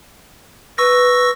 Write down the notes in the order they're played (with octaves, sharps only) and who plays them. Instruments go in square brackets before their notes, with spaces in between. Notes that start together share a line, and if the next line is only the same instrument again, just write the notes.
[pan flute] B4 [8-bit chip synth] C#6 E6 A#6